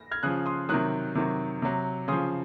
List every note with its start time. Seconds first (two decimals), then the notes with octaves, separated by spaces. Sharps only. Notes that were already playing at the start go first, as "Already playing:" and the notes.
Already playing: A#6
0.11 F6 G#6
0.23 C#3 F3 D#6 F#6
0.46 C6 D#6
0.69 C3 D#3 F#3 D#6 F#6
1.15 C3 D#3 F#3
1.62 C3 F#3
2.08 C#3 F3 C6 D#6